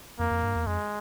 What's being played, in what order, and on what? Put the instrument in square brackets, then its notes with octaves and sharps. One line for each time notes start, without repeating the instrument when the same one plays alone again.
[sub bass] F2 [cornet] A#3
[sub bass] F2
G2
E2
[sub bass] F2 [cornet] G#3